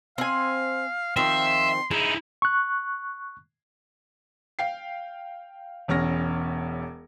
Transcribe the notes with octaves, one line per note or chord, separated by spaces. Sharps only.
C4 F5 G#5
D#3 F3 C4 E5 C6
D#4 E4 G#4
C#6 F#6
F5 G5 C7
E1 E2 C#4 F6 A#6